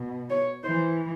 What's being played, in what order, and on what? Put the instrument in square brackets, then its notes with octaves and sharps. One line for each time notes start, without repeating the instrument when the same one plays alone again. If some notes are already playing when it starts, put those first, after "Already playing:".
Already playing: [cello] B2
[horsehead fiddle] C#5
[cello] E3 [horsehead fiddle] C5